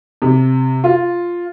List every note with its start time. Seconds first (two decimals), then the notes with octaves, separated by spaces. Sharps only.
0.22 C3
0.84 F4